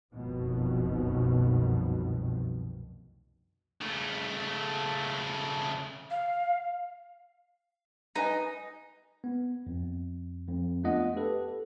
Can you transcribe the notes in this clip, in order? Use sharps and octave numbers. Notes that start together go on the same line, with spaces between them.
F1 C2 F#2 B2 D#3 F3
C#3 A3
F5
D#4 B4 D#5 G#5
B3
F2
F2
A3 B3 D4 F4 D#5 F#5
G4 A4 B4